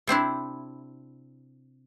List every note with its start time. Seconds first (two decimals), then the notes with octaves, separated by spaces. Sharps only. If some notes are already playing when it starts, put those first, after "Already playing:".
0.07 C3 C4 D4 E4